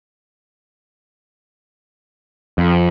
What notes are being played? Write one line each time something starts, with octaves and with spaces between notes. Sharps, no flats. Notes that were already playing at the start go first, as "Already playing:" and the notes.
F2